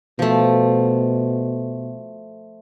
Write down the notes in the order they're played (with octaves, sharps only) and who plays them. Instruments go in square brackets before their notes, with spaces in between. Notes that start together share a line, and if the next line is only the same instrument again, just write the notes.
[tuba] B2 [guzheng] F3 A3